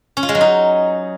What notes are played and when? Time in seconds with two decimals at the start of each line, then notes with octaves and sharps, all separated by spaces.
0.17 C#4
0.23 F4
0.29 G#3
0.35 F#3
0.41 D#4